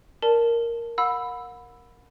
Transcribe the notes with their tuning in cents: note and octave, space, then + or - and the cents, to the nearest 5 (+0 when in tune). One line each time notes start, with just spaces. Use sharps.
A#4 +0 D5 +0 A5 +0
F#5 -35 B5 +10 E6 +0